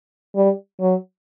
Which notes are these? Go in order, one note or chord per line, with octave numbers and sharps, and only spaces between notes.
G3
F#3